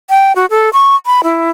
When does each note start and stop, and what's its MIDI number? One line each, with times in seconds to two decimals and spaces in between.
0.10 0.33 79
0.36 0.46 66
0.50 0.70 69
0.73 0.95 85
1.06 1.21 83
1.24 1.51 64